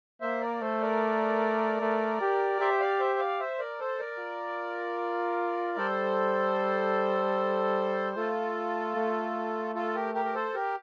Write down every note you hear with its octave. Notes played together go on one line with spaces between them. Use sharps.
A#3 C5 E5
A#4 D5
A3 A4 C5
A#4 D5
A3
G4
G4 C5 E5
D5 F5
C5 E5
D5 F5
C5 E5
A#4 D5
A4 C5
A#4 D5
F4
G3 A4 C5
A3 F4 A4
A3
F4 A4
G4 A#4
G4 A#4
A#4
A4 C5
G4 A#4